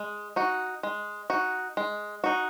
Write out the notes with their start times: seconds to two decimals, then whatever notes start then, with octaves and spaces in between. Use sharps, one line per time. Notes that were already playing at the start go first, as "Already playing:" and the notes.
Already playing: G#3
0.36 D#4 F#4
0.83 G#3
1.30 D#4 F#4
1.77 G#3
2.24 D#4 F#4